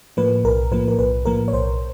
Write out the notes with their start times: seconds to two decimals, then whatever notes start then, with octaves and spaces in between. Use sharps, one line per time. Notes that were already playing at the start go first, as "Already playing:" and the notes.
0.17 A2 F3 A#3 B4
0.44 B1 A#4
0.72 A2 F3 A#3 B4
0.88 A#4
0.99 B1 B4
1.25 A2 F3 A#3 A#4
1.48 C#5
1.53 B1 C5